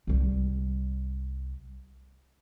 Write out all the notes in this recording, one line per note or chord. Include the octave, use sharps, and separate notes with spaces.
C2 G3